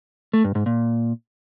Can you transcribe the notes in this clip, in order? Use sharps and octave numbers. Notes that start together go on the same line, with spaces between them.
A3
G2
G#2
A#2